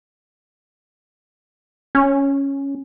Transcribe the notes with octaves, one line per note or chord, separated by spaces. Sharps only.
C#4